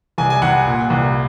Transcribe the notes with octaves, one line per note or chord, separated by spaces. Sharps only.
C2 G#5
G#5
C2 F#5
A#2
C2